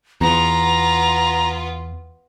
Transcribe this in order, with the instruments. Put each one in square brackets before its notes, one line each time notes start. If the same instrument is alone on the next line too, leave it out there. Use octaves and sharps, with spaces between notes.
[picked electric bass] E2 [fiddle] B3 F4 [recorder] A#5